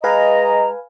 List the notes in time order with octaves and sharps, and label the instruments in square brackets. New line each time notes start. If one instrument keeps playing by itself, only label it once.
[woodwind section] G#3 D#5 A#5 [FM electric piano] B4 F5 G#5